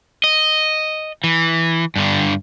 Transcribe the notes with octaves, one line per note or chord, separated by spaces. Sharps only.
D#5
E3
G2 D3